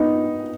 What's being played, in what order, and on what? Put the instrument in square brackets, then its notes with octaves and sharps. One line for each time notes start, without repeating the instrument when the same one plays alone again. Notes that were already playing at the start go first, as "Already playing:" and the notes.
Already playing: [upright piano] B3 D#4